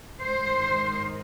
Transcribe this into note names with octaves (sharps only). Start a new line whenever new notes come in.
G#2 D#3 C5